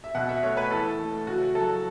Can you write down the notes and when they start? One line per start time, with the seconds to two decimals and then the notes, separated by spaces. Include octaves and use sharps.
0.04 E5
0.15 B2 F#5
0.29 E5
0.43 A3 C#5
0.57 B4
0.71 E3 A4
0.99 A3
1.27 C#3 F#4
1.55 F#3 A4